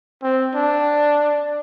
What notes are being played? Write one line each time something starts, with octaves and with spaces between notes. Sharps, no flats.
C4
D4